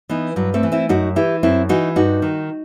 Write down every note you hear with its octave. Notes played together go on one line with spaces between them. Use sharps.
E3 B3 D#4
G2 F#3
A3 C4
E3
C4 E4
F#2 D#4 F#4
E3 E4 G4
F#2 C4 E4
E3 D#4 F#4
G2 D#4 F#4
D#3